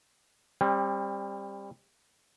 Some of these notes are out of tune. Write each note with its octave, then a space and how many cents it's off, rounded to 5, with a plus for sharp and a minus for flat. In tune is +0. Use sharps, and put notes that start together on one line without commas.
G3 +20 C4 +40